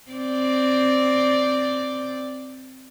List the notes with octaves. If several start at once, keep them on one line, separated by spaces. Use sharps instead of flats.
C4 D5